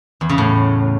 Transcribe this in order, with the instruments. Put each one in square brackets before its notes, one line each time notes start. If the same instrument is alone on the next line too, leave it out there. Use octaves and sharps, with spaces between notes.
[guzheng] E2
C#3
A2